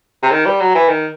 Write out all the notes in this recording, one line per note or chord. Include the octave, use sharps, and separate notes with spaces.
C3
D#3
G3
F#3
E3
D#3